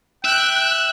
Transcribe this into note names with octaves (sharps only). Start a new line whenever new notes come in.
E5 G5 F#6